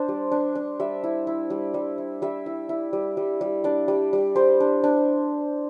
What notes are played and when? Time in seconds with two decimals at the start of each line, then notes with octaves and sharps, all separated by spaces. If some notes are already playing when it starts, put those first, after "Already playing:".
Already playing: D4 C5 D5
0.08 G3
0.32 D4
0.55 D4
0.80 G3 E5
1.04 E4
1.27 E4
1.50 G3
1.74 G3
1.98 E4
2.22 G3 E5
2.46 E4
2.69 E4
2.93 G3
3.17 G3
3.41 G3
3.64 D4 D5
3.88 G3
4.13 G3
4.35 G3 C5
4.60 D4
4.84 D4